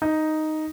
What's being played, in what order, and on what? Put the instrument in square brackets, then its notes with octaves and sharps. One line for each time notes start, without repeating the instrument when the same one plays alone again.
[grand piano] D#4